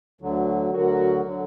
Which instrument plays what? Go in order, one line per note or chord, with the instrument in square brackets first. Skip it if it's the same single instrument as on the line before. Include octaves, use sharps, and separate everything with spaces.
[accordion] D2 D3 F#3
[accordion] D2 D3 F#3 [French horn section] F#4 A#4
[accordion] D3 F#3